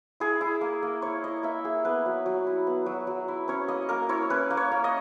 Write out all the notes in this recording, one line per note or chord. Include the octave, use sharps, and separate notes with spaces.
E4 G#4
E4
A#3
A#3
E4 C#5
E4 D#5
A#3 E5
A#3 G#4
B3 B4
F#3
F#3
E4
B3
F#3
F#3
E4
C#4 C#5
A#3 D#5
A#3 A#4
E4 C#5
C#4 B4
A#3
C#5
A#3
D#5